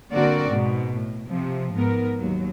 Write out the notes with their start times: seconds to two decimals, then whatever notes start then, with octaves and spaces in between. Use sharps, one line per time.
0.12 D3 A#3 C4 F#4 A#4 D5
0.48 G#2 B2
0.96 A2
1.28 C3 F3
1.73 G#2 B3 A#4
2.17 D#2 F#3